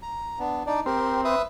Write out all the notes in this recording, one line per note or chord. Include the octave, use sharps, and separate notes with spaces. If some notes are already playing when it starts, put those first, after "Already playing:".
A#5
B3 D4
D4 D#4 D5
C4 G4 A#4
B4 E5 D#6